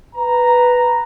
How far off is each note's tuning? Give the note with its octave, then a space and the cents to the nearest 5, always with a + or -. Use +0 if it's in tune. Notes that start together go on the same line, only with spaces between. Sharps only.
B4 +0 A#5 +0